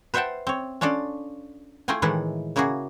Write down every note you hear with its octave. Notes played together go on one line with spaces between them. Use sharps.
B4 C5 E5 F#5 G5 A5
C4 C#5
C#4 D4 F4 A4 D5
A3 E4 F4 G5 G#5
A2 D#3 E3 G#3 E4 B4
C#3 A#3 E4 F#4 G#4